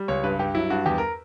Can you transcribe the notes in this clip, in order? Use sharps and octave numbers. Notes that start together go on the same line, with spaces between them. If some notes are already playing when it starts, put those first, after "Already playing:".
Already playing: G3
C#2 C#5
G2 B4
G2 G4
F#3 E4
G2 F#4
E2 G4
A#4